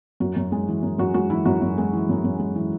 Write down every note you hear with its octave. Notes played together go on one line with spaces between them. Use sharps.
F#2 F#4
F#2
G#3
E3
F#2
F#2 F#4
G#3 F#4
E3 E4
F#2 F#4
F#2
G#3
E3
F#2
F#2
G#3
E3